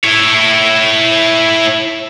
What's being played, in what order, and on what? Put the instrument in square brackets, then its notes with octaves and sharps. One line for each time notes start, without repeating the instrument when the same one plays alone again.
[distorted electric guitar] E4 C#5